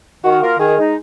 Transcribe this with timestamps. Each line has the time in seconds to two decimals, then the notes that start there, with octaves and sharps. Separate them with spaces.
0.24 D#3 F#4
0.42 A#3 F4 A#4
0.59 D#3 G#4
0.77 G#3 D#4